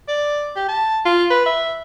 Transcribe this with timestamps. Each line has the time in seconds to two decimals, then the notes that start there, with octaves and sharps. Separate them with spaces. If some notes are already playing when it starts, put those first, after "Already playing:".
0.08 D5
0.56 G4
0.69 A5
1.05 F4
1.30 B4
1.46 E5